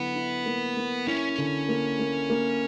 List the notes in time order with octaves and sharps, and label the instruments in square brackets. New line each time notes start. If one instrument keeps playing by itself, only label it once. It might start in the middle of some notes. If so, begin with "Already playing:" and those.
Already playing: [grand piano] D3 F#3 E4 [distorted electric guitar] B3
[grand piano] E4
A#3
A#3
[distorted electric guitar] C#4 [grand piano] E4
[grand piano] D3
A#3
A#3
A#3